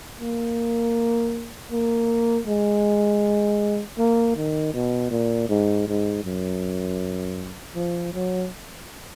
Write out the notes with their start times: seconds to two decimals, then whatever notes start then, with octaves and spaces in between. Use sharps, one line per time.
0.20 A#3
1.71 A#3
2.47 G#3
3.98 A#3
4.37 D#3
4.74 B2
5.11 A#2
5.49 G#2
5.87 G#2
6.24 F#2
7.75 F3
8.14 F#3